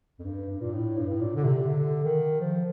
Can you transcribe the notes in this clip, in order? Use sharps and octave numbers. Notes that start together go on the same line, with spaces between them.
F2
G2
G2
A#2
A2
G2
A2
A#2
D3
C3
D3
D#3
F3